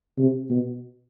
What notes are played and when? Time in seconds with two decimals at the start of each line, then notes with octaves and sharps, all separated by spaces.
0.18 C3
0.50 B2